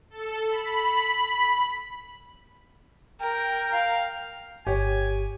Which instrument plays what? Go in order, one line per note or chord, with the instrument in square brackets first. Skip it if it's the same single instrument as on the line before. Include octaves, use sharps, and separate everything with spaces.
[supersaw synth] A4
B5
[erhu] A#4 [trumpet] G5
[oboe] F5
[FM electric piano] G1 [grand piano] G4 C#5 [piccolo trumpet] G#5